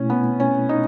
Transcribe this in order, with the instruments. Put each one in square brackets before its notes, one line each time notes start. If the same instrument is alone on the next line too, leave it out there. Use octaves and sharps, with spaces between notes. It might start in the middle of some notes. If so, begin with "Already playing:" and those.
Already playing: [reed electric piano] B2 A3 E4 [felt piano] C#4
[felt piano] B3
C#4
D#4